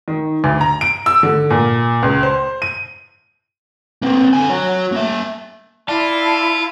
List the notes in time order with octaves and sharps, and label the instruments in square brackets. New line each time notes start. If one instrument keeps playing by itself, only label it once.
[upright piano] D#3
D2
A#5
D7
E6
D3
A#2
C#2
C5
D#7
[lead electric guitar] A#3 C4
D3 G#5
F#4 C#5
A#3 E5
[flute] E4 [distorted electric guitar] F4 [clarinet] D5 [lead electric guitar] A5